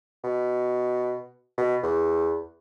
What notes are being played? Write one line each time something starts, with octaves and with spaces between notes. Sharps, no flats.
B2
B2
E2